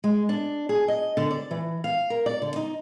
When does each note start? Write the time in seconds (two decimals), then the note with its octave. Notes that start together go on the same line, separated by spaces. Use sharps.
0.04 G#3
0.29 D4
0.69 G#4
0.88 D#5
1.17 D3
1.30 D5
1.51 E3
1.84 F5
2.10 A#4
2.26 D5
2.42 D3
2.56 D#4